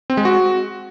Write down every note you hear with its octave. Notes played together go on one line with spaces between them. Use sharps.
C4
G#3
F#4